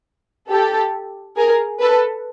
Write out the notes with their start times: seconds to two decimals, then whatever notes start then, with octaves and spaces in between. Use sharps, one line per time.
0.50 G4 A4
1.37 G#4 A#4
1.80 A4 B4